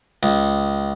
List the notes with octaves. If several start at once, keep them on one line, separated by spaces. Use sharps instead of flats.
C#2